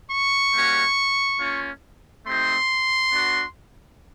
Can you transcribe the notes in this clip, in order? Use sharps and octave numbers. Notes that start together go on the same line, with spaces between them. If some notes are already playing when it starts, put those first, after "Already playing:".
C#6
G3 A#3 C#4 F#4
A#3 C#4 F4
A3 C4 D#4 G4 C6
B3 D4 F#4